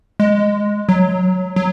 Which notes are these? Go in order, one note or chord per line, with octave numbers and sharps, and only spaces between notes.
G#3
F#3
F#3